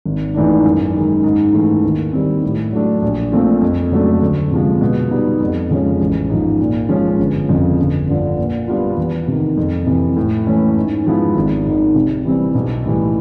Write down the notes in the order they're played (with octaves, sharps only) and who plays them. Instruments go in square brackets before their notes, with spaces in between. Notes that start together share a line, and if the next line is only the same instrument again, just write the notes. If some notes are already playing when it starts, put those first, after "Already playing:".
[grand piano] G#1
G#2 E3 A3 D4
F#2
D#3 G#3
G#2
E3 A3
D#2
D#3 G3 C4
A2
F#3 A3 D4
A#1
A#2 F3 A3 C4
F2
C#3 F#3 A3 D4
D2
C3 F3 G#3
B2
G3 B3 D#4
F2
C#3 F3 G#3 C#4
A1
G#2 F3
A#2
F3 G#3 C#4 F4
G1
F2 C#3 F3
G1
G2 D3 F3
A#2
G3 B3 D4 F4
E2
C3 D#3
F2
C3 E3
A2
E3 A3 C#4
G#2
F3 G#3 B3 E4
G#1
G#2 D#3
C3
E3 G3 C4
B1
A2 E3 G3